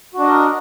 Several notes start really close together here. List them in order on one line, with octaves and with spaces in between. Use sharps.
F#4 D4 D#5 A#4